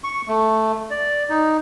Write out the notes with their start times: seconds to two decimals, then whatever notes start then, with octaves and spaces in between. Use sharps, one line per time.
0.04 C#6
0.28 A3
0.90 D5
1.30 D#4